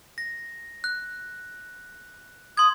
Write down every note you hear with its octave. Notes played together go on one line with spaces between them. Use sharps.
A#6
F#6
C6 D#6 G#6